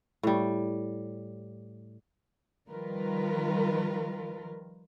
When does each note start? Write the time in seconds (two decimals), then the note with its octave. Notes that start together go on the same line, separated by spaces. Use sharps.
0.23 A2 G3
2.69 D#3 F3 G3 F4 A#4 B4